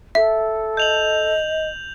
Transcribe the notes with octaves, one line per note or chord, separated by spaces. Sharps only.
A4 E5
D#5 G6 F7 F#7